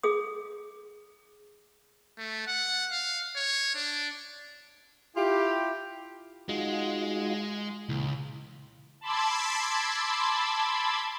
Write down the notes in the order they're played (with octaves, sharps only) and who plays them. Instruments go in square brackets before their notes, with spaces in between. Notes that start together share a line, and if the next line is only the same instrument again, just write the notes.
[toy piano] G#4 D#6
[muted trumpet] A3
F#5
F5
C#5
D4
[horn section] E4 F4 G4
[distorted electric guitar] G#3 [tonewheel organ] D#4 F4 F#4
[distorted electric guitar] C#2 [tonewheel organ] A#2 E3
[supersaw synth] A5 B5 C6 D6 E6 G#6